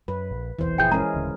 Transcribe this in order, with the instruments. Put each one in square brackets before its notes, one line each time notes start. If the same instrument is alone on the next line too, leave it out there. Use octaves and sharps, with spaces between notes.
[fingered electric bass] F#2 [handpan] B4
[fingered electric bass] A#1
[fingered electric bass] F1 B1 E2 [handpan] E3 C5
[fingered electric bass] F#1 A#2 F3 [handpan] E4 G#4 [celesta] G5 G6
[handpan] G#3 C#4 A#4 [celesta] A#5
[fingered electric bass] D1 D2 C#3